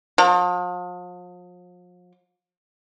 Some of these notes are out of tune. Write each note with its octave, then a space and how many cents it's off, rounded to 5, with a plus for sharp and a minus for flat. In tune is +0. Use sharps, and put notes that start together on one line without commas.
F3 +40